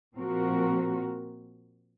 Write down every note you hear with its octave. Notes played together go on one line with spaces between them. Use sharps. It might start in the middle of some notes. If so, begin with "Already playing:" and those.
A#2 F3 C4 F#4 A#4